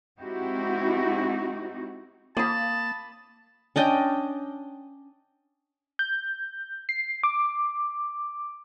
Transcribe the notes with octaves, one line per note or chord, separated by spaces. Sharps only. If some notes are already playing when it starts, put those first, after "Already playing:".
G#3 C4 D#4 E4 F#4 G4
A#3 A5 B5 D#6
C#4 D4 D#5 G5
G6
C7
D6